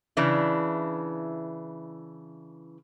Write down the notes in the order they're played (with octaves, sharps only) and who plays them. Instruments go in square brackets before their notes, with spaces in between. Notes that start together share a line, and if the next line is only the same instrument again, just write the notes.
[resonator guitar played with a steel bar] C#3 E3 D4 E4